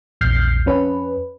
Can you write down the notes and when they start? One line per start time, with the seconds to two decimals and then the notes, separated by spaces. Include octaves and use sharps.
0.21 A#1 E2 F6 G6 C7
0.66 F2 C#4 B4